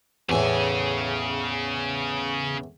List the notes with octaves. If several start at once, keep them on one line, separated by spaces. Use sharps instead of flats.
E2 A2 C#3 G#5